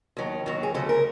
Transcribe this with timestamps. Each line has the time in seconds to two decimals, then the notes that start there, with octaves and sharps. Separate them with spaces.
0.17 D#2 D#3 F#3
0.46 D#2 D#3 F#3
0.63 G#4
0.74 D2 C#3 F#3 A4
0.89 A#4